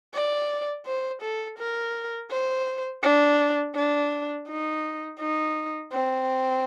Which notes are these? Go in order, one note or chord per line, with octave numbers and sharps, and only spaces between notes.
D5
C5
A4
A#4
C5
D4
D4
D#4
D#4
C4